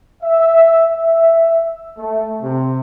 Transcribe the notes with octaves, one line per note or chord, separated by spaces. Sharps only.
E5
E5
A3
C3